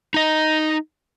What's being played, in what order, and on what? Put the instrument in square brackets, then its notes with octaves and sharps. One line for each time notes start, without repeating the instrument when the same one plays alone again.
[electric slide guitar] D#4 D#5